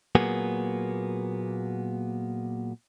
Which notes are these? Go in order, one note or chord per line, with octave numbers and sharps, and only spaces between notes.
A#2 F#3 A#3 B3 G#4